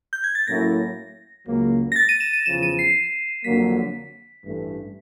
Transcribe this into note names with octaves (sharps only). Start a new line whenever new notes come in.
G6
G#6
A6
A2 F#3 A#3 C#4 E4 A#6
C#2 C#3 F#3 A#3
A#6
A6
D#7
E7
D#7
E2 C#3 F3 E7
D#7
C7
F2 D3 F#3 A#3 B6
A1 G2 E3 A3